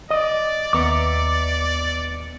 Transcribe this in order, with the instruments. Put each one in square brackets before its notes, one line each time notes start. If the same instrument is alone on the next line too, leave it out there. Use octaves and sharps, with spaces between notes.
[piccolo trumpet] D5 [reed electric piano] D#5 D#6
[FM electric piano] D#2 B3 C#7 [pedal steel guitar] E5 A#5 D6